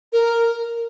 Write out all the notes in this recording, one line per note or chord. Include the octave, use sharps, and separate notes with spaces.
A#4